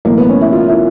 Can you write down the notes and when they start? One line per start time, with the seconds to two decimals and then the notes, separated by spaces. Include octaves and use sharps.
0.05 B1 A2 E3 A#3
0.18 B3
0.29 C#4
0.41 E4
0.52 F4
0.68 E4